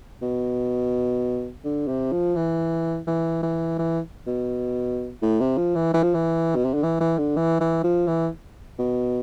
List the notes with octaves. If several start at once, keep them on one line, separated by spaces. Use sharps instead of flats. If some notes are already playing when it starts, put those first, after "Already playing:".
B2
D3
C3
F3
E3
E3
E3
E3
B2
A2
C3
F3
E3
E3
F3
E3
B2
C3
D3
E3
E3
D3
E3
E3
F3
E3
B2